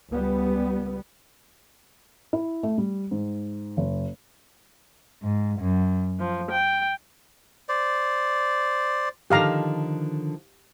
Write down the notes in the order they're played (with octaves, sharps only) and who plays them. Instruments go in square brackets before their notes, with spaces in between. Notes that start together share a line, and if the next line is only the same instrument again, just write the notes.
[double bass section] C#2 G3 B3
[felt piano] E4
A3
G3
G#2
F#1
[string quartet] G#2
F#2
F3
G5
[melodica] C5 D5
[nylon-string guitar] D3 D#3 F3 [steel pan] G4 F5 A#5